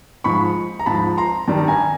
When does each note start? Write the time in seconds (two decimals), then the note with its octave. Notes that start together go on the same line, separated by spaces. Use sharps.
0.24 G#2 F3 B5 C#6
0.79 A#5
0.86 G#2 F3 A5 B5
1.17 A#5 C6
1.48 G2 D#3 G3
1.68 G#5 A#5